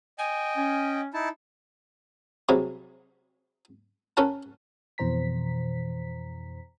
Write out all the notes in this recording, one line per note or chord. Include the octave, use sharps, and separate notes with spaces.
D#5 G5 G#5
C#4
D#4 E4 A5
C3 F#3 G3 G#4
C#4 A4 A#4 F#5 A5
F2 B2 E3 C5 A#5 B6